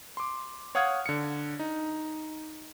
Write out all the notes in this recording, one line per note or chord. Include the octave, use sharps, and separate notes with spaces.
C6 D6
C#5 F5 F#5 D#6 F6 G#6
D3 C#7
D#4